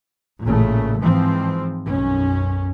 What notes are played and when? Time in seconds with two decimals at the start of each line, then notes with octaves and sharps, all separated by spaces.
0.43 A1 A#2 C#3 A3
0.98 G#2 E3 F3 C4
1.86 B1 F#2 C#4